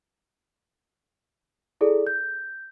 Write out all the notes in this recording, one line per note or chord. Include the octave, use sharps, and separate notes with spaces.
E4 G#4 A4 D5
G6